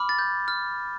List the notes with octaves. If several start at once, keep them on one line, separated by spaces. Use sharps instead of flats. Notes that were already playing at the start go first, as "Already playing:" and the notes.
Already playing: B5 D6 F6
A6
G6
F6